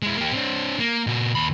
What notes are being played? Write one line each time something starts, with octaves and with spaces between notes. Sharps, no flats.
G#3 E4
A#3 G4
C4 D4
A#3
A#2 F#4
D#2 B5